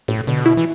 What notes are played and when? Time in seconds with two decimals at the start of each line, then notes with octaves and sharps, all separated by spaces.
0.08 G1 A2
0.27 B2 D3
0.46 E4
0.57 E3